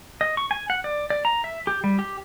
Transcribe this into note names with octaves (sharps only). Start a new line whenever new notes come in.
D#5
C#6
G#5
F#5
D5
D5
A#5
E5
G4
G3
G4